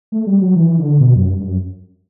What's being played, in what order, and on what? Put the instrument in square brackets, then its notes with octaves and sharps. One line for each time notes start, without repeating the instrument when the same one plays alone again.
[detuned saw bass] A3
G3
F#3
E3
D3
B2
F#2
G2
G2
F#2